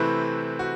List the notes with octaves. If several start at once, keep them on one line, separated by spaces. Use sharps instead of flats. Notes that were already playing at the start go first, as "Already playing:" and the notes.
Already playing: C3 E3 A3 C4 E4 B4
F#4